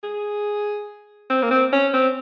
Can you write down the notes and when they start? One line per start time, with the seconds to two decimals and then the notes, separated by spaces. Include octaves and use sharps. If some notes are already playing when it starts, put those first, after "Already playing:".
0.03 G#4
1.30 C4
1.42 A#3
1.51 C4
1.72 C#4
1.94 C4